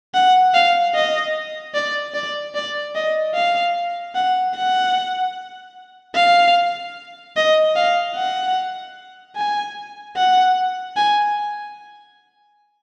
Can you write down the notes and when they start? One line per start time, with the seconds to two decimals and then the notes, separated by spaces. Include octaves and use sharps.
0.14 F#5
0.54 F5
0.95 D#5
1.74 D5
2.14 D5
2.55 D5
2.95 D#5
3.35 F5
4.15 F#5
4.55 F#5
6.15 F5
7.36 D#5
7.76 F5
8.16 F#5
9.36 G#5
10.17 F#5
10.96 G#5